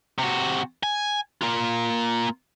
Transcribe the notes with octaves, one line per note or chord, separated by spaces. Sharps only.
C3 F#4
G#5
A#3 F4